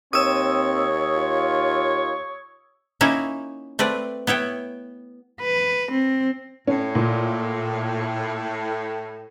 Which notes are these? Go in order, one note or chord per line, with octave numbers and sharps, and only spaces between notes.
D#2 C4 C#5 D#6 E6
F4
A#3 C#4 D#4 E4
A3 C4 B4 D5
B3 E4 C#5 G5
B4
C4
A2 C#4
A#2